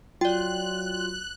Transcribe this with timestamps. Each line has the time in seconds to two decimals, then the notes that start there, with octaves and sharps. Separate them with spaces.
0.21 F#3 F4 D5 G5 F#6